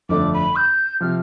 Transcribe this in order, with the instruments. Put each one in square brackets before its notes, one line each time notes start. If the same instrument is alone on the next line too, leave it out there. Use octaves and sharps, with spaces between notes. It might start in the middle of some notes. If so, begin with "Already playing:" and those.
[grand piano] G1 F2 D3 A3 D4 [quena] D6
[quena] B5
G6
[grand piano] C3 F3 [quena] F6